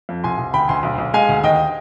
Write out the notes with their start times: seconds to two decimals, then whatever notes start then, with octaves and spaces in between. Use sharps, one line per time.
0.09 F2
0.24 C2 G#5 C6
0.38 C2
0.53 D2 G5 B5
0.68 D2 G#5 C6
0.83 B1
0.98 B1
1.14 G#3 F5 G#5
1.28 D2
1.43 D#2 D#5 G5